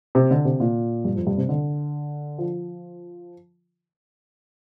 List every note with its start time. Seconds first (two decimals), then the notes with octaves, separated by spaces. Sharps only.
0.15 C3
0.31 D3
0.45 C3
0.60 A#2
1.05 G2
1.16 F2
1.27 G2
1.37 C3
1.49 D3
2.38 F3